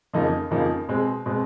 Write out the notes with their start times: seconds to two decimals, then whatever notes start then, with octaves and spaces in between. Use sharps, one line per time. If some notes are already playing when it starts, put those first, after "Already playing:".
0.13 F2 C#3 F3 A#3 D#4
0.51 F2 C#3 F3 A#3 D#4
0.88 B2 G#3 C4
1.26 B2 G#3 C4